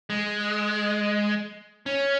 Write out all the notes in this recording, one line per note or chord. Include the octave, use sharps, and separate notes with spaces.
G#3
C#4